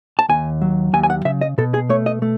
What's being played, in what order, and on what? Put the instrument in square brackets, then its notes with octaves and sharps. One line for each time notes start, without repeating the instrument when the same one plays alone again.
[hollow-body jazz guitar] A5
D#2 G#5
F#3
D#2 G#5
G#5
F#5
C#3 E5
D#5
B2 A4
G#4
A3 C#5
D#5
A3